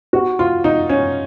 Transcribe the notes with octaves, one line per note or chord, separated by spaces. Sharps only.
F#4
F4
D#4
C#4